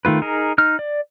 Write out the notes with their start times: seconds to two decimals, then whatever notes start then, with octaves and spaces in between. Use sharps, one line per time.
0.05 D#3 A3 F4 B4
0.22 D#4 G#4 A#4
0.58 D#4 F6
0.79 D5